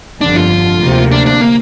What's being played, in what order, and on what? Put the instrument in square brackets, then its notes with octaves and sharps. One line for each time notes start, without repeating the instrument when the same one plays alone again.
[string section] G1 F2 D3 [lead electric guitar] D4
[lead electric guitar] F4
[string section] D2 C3 A#3
[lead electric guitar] D4
D4
A#3